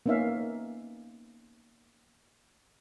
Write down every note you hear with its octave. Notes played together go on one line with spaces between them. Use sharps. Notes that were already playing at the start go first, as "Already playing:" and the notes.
A#3 B3 C#4 D#4 E5 F5